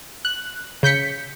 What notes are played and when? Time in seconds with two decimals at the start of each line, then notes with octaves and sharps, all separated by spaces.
0.25 F#6
0.83 C#3 G6 B6 C#7